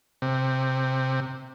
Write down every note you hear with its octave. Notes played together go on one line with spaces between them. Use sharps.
C3